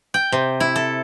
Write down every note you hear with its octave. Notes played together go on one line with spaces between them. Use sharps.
G5
C3
E4
A4